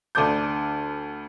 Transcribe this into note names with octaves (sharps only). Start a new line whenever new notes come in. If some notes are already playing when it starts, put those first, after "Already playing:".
D2 D4 A4 D6 G6